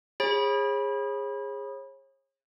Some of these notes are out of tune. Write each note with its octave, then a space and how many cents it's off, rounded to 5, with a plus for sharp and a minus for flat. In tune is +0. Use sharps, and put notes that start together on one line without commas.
G#4 -20 C#5 -40 B5 -20